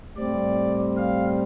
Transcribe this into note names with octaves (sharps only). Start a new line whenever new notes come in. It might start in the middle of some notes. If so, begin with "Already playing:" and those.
A2 G3 C4 D5
F5